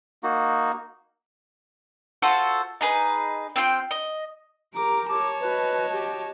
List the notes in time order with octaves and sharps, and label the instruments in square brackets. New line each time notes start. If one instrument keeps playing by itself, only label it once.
[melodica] A#3 D#4 F#4
[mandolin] F4 F#4 A4 C5
D#4 G#4 B4
C4 F4 G5
D#5
[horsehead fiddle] G4 A#4 [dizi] A#5 [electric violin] D6
[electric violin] C#5 A5 [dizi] D6
[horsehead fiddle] F#4 D#5 [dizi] B4
[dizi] G4